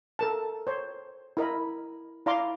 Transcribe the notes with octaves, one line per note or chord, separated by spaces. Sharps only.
A4 A#4 A5
C5 C#5
E4 A#4 D#5 B5
E4 D5 F5 A#5 C6 D6